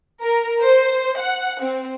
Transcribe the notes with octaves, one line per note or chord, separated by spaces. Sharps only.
A#4
C5
F#5
C4